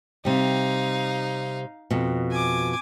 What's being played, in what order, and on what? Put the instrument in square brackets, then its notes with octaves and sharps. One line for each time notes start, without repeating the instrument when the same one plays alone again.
[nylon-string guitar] C3 G3 [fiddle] D#4 F5
[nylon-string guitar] F2 B2
[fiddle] G#5 D6